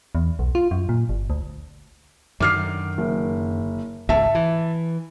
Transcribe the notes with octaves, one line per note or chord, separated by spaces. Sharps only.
E2
B1
F4
F#2
A#2
G1
D2
F#2 D3 D#3 D6 F6 C7
F#1
G#1 C#2 G#2 E5 A5
E3